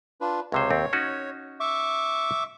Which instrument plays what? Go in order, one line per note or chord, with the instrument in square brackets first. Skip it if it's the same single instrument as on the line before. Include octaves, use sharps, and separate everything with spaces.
[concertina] D4 F4 B4
[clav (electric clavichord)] C#2 C3 C5 [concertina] C#5
[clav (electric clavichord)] D#2 C4
C#4 D#4 F#4
[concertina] E5 C#6 D6